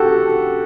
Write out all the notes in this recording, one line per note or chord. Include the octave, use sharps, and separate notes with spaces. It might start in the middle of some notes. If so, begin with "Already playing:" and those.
Already playing: F#4 G4 A4